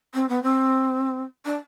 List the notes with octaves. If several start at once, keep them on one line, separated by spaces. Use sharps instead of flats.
C4
B3
C4
D4